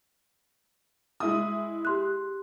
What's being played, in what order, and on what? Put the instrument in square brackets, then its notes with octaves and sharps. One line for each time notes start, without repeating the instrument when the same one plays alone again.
[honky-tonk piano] G#3 E4 D#6
[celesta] G4 C6 F#6